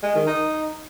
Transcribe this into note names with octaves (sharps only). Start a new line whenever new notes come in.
G#3
D#3
D#4